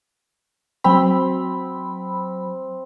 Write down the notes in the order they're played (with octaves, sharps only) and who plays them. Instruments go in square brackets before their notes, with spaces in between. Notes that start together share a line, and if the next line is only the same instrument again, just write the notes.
[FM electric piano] F#3 B5 [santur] C4